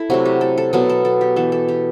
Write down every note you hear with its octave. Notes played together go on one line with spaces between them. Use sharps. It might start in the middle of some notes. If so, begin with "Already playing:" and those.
Already playing: E4 A4
C3 F#3 A3 F#4
G4
A4
A4
B2 F#3 B3 A4
A4
A4
G4
E3 B3 A4
A4
G4